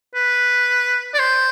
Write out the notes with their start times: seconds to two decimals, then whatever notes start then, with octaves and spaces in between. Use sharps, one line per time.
0.15 B4
1.14 D5
1.19 C5